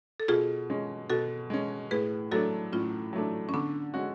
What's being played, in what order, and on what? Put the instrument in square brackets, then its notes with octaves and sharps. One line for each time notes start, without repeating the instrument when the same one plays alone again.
[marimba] A4
[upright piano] B2 [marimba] F4 G#4
[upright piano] G#3 C#4
[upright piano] B2 [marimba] F#4 A4
[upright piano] G#3 C#4
[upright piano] A2 [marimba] G#4 B4
[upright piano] F#3 A3 D4 [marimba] F#4 A4
[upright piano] A2 [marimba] C#4 F4
[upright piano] F#3 A3 D4
[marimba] C#4
[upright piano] D3 [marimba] B3 D4
[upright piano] G#3 C#4 F#4